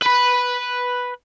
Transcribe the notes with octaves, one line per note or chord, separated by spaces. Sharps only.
B4 B5